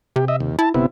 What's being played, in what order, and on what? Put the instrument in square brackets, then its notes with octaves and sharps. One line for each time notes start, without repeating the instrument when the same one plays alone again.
[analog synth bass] C3 [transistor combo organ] G4
[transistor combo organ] D#5 E5
D#2
[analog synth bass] E4 [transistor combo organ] A5
[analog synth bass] G1 [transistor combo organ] C3 B3 E4